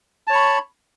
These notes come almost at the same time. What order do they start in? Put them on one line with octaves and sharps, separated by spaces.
A5 C#5 C#6 B5